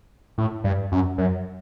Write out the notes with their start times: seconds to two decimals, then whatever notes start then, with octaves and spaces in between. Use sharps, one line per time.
0.38 A2
0.64 G2
0.92 F#2
1.18 F#2